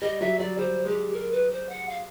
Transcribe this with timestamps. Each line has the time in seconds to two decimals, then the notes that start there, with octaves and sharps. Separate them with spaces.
0.01 G3 D#5
0.21 F#3 E5
0.39 F#3 D5
0.58 G3 C5
0.85 G#3 G4
1.13 A#4
1.32 B4
1.51 C5
1.69 F#5
1.89 F5